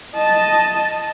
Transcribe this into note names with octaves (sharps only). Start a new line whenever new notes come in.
D#5 A5